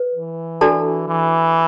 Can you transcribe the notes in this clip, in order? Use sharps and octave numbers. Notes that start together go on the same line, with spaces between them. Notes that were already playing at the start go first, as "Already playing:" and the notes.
Already playing: B4
E3
D4 F#4 A4 D5 A5
E3